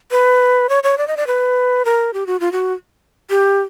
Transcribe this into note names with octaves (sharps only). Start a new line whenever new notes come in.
B4
C#5
C#5
D5
D#5
D5
B4
A#4
G4
F#4
F4
F#4
G4